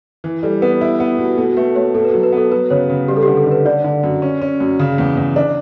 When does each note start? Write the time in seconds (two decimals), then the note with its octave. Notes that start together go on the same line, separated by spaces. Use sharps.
0.24 E3
0.43 G3 A4
0.62 B3 B4
0.81 E4
1.00 B3
1.19 B2
1.38 B2 A4
1.57 A3 B4
1.76 A3 C#5
1.94 B2 A4
2.05 B4
2.09 F#3 A4
2.23 B4
2.33 B3
2.38 A4
2.52 F#3 B4
2.70 C#3 C#5
2.90 C#3
3.08 G3 G4
3.17 A4
3.23 D3 G4
3.37 A4
3.47 D3 B4
3.65 D3 D5
3.84 D3
4.03 F#2
4.22 C#4
4.42 C#4
4.60 F#2
4.79 C#3
4.98 E2
5.17 E2
5.36 D4